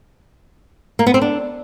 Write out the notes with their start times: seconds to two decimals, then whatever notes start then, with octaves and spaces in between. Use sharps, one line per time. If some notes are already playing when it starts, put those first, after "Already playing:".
0.99 A#3
1.07 B3
1.14 C4
1.22 D4